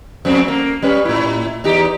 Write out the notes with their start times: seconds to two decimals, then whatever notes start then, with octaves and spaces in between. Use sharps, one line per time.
0.25 F2 A3 C4
0.48 A#3
0.82 G3 C#4 B4
1.05 A2 E4
1.64 E2 D#4 G4